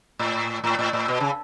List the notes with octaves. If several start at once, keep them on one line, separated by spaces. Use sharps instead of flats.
A2
A2
A2
A2
B2
C#3